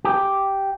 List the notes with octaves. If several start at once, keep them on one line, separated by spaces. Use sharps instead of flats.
G4